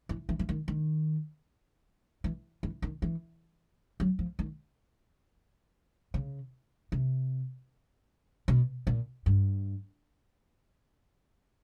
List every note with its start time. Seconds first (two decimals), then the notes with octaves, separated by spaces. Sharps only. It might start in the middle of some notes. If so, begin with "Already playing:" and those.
0.09 E3
0.29 E3
0.39 E3
0.49 D#3
0.68 D#3
2.24 E3
2.63 E3
2.82 D#3
3.02 E3
4.00 F#3
4.19 F3
4.39 D#3
6.14 C#3
6.92 C3
8.48 B2
8.87 A#2
9.26 G2